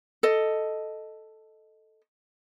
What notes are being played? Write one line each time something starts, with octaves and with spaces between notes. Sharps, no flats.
A4 D#5